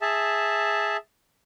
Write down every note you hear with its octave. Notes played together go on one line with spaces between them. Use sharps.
G#4 E5 A5